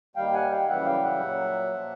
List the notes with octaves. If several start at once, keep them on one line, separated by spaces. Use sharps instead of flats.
D#2 D#3 G3 F5 G5
F#5 G#5
F5 G5
F#2 C#3 E3 G3 E5 F#5
F5 G5
E5 F#5
A#2 F#3
A#2 F3